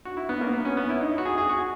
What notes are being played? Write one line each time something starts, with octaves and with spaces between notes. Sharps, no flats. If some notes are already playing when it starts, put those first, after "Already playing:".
F#4
E4
B3
A#3
B3
C#4
B3
E4
D#4
F#4
G#4
G#4
F#4